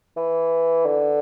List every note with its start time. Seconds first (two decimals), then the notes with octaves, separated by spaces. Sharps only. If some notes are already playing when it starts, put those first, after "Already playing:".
0.16 E3
0.86 D3